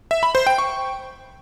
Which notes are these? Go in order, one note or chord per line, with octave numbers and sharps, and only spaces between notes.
E5
B5
C5
G5
C#6